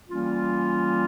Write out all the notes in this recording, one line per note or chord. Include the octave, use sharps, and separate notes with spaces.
E3 G3 A#3 C#4 F4